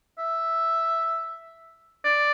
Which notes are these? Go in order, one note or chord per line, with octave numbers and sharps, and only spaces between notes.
E5
D5